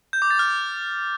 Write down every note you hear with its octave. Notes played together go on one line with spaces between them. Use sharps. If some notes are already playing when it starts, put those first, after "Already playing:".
G6
D6
A6
F6